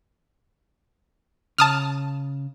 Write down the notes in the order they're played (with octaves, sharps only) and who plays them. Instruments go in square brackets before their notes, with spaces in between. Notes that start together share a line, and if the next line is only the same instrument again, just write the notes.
[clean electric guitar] C#3 [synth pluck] A5 D#6 F6